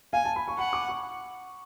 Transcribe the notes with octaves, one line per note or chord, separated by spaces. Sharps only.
F5 G#5
A5
B5
C#6
F#5 B5
D6
C#6